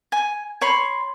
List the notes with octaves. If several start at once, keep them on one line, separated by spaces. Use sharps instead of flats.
G#5
C#5 B5 C6